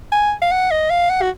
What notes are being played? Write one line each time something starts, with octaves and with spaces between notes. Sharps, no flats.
G#5
F5
F#5
D#5
F5
F#5
F#4